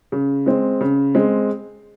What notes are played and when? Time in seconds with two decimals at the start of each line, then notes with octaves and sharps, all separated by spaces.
0.12 C#3
0.46 G#3 C4
0.81 C#3
1.15 G#3 C4